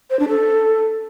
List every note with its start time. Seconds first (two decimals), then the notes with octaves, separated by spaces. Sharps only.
0.10 C5
0.19 D4
0.28 A4